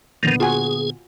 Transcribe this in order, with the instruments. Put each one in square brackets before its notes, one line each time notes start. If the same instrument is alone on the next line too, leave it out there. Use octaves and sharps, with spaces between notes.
[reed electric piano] A#2 D3 B3 [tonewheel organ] D#3 F3
[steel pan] F4 F#4 G#5 [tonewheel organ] G#4